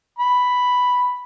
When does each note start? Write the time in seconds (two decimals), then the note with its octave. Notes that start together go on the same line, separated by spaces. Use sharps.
0.19 B5